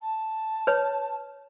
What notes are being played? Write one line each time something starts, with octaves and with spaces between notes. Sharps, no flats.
A5
B4 C#5